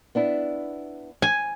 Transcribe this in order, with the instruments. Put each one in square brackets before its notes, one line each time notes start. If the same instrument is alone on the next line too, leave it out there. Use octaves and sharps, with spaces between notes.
[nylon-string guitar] B3 D4 E4
[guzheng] G#5